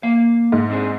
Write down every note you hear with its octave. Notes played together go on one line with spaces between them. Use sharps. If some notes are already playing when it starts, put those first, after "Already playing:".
A#3 F5
G#2
C4 D4 G#4